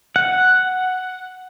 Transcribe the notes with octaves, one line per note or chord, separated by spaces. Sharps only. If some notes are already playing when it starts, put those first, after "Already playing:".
F#5